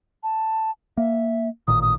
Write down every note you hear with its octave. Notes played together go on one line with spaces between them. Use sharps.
A5
A#3 E5
A1 A#2 D#3 D#6
D#6